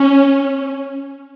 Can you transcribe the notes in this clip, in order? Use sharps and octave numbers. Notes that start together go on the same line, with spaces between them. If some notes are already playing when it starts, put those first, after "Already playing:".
Already playing: C#4